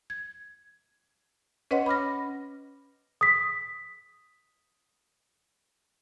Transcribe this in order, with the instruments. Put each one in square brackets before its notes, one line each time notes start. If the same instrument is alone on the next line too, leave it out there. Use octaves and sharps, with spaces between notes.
[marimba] G#6
C#4 B4 C#5 D#5 F#5 C6
B5 D6 F6 A#6
[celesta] D#6 B6